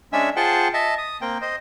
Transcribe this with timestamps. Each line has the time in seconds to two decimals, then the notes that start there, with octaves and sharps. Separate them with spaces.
0.13 G#3 C#4 D4 E5 G#5 E6
0.36 F4 G#4 C5 F#5 G5 A5
0.74 D#5 E5 A5
0.98 D#6
1.21 A#3 C4 G5
1.41 C5 D#5